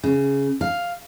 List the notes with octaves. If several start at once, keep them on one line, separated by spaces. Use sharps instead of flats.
C#3
F5